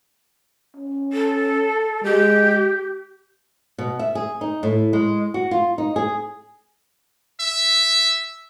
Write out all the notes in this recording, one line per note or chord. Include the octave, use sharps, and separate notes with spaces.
C#4
A4
G#3 G4
B2
E5
G#4
D#4
A2
G#3
F#4
F4
D#4
G#4
E5